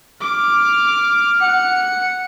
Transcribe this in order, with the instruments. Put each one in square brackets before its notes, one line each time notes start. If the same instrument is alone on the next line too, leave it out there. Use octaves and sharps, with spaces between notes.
[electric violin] D6 [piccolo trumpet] F6
[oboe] F#5 [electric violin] C#7